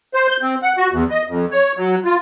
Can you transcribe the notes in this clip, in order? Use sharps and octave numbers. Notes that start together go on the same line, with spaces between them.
C5
G6
C4
F#5
F#4
E2
D#5
F2
C#5
F#3
F4